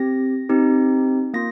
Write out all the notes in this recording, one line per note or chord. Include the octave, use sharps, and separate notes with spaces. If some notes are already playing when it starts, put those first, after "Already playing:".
Already playing: C4 G4 A#6
C4 D#4 G4
A#3 F4 A#6